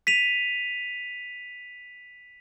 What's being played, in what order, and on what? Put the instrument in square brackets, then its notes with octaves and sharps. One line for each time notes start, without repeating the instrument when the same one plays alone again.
[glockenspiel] B6 D#7 F7